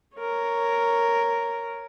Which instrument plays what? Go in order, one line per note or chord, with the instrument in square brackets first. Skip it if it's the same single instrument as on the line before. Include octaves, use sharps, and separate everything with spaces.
[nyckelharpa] A#4 C#5